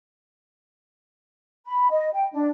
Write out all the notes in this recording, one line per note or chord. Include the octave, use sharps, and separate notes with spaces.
B5
D#5
G5
D4